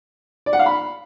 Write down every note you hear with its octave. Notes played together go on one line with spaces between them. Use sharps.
D5
F#5
F5
B5